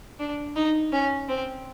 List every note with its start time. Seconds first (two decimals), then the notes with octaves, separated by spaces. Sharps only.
0.19 D4
0.56 D#4
0.92 C#4
1.28 C4